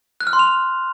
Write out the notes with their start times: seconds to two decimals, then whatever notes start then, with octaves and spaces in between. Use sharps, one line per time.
0.21 F#6
0.27 F6
0.33 C6
0.39 F7